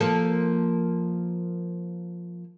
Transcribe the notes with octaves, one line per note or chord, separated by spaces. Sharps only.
F3 A#3 A4